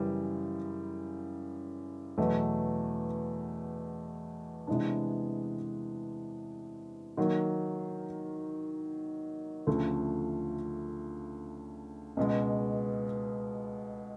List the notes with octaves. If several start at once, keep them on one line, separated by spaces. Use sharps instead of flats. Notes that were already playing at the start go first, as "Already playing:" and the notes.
Already playing: F#2 C#3 E3 G3
E2 B2 F#3 A3
C3 E3 G#3 B3 D4
D#3 F#3 A#3
D2 C#3 F3 A3
C#2 B2 G#3